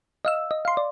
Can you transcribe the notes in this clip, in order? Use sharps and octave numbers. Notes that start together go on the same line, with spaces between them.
D#5 F5 E6
D#5
F5 C6
D5